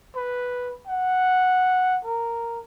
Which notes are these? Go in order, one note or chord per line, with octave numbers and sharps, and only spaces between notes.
B4
F#5
A#4